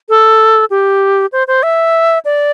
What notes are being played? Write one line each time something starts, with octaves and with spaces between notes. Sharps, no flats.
A4
G4
C5
C5
E5
D5